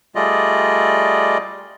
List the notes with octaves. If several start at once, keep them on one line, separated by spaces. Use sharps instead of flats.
G3 A3 F4 G#4 D5 D#5